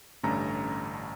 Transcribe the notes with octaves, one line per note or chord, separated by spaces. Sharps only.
A1 G2 D3 A3 C#4 A#5